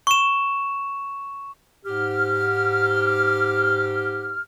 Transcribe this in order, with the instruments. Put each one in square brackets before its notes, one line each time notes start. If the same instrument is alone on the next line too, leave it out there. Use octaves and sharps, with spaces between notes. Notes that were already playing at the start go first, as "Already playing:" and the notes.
[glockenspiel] C#6 E7
[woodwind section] G#2 G4 F6